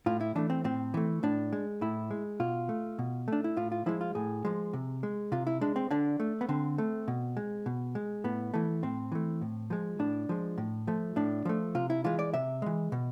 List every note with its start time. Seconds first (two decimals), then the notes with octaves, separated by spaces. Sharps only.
0.06 A2 F4
0.21 E4
0.35 E3 A3 D4
0.50 C4
0.64 A2 C4
0.94 E3 A3
1.23 A2 D4
1.52 G#3
1.81 A2 E4
2.11 G#3
2.40 B2 F4
2.69 A3
2.99 B2
3.28 A3 D4
3.44 E4
3.57 A2 F4
3.72 F4
3.86 F3 G#3 E4
4.01 F4
4.15 A2 G#4
4.45 F3 G#3
4.73 C3
5.03 G#3
5.32 C3 F4
5.47 E4
5.61 G#3 D4
5.76 C4
5.91 D3 D4
6.20 A3
6.41 B3
6.49 D3 C4
6.78 A3
7.08 B2
7.37 G#3
7.66 B2
7.95 G#3
8.24 A2 B3
8.54 E3 A3
8.83 A2 C4
9.12 E3 A3
9.41 A2
9.70 F3 G#3
9.99 A2 D4
10.29 F3 G#3
10.58 A2
10.87 F3 A3
11.16 A2 D4
11.45 F3 A3
11.75 C3 F4
11.90 E4
12.04 E3 G#3 F4
12.19 D5
12.34 C3 E5
12.62 E3 G#3
12.92 B2